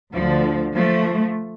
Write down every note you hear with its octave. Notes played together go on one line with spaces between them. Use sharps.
D2 D3 F3
F3 A3